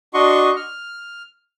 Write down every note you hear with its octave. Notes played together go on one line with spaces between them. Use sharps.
D4 F#4 D#5 C6 C#6
F6